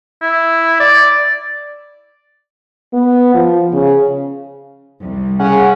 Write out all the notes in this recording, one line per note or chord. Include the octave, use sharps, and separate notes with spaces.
E4
D5
B3
F3
C#3
C2
C#3 C#4 F#5